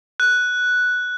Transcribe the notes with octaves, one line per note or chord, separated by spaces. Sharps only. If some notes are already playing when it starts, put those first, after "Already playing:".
F#6